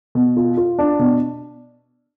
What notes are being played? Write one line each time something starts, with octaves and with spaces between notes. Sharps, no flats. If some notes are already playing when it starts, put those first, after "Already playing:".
B2
F4
F4
D4
B2